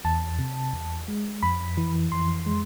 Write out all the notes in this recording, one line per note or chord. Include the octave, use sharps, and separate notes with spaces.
E2 A5
C3
E2
G#3
F2 B5
E3
F2 C6
G#3